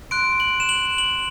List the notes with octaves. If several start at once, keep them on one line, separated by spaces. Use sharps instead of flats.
C6 F#6 D7
F#7
E7
F#7
F#7